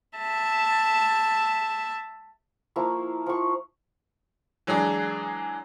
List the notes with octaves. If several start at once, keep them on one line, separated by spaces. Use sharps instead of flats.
E5 A5
F3 A#3 E4 C#6
F3 C#6
E3 F#3 G#3 D4 G#4